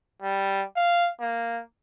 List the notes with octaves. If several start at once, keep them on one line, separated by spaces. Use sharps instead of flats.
G3
F5
A#3